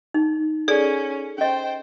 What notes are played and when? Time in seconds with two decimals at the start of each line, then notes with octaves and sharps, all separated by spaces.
0.14 D#4
0.68 C#4 G#4 A4 D5
1.38 C#4 C5 D#5 G5